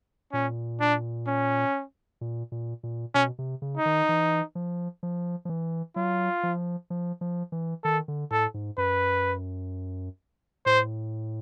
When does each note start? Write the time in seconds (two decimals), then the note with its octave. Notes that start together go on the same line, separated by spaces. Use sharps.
0.33 A#2 C#4
0.80 D4
1.27 C#4
2.21 A#2
2.52 A#2
2.83 A#2
3.14 B2 C#4
3.39 C3
3.62 C#3
3.77 D#4
3.86 D#3
4.09 E3
4.55 F3
5.03 F3
5.45 F3
5.49 E3
5.96 F#3 F4
6.43 F3
6.90 F3
7.21 F3
7.52 E3
7.84 D#3 A4
8.08 D3
8.31 A2 A4
8.54 G#2
8.77 F#2 B4
10.66 A2 C5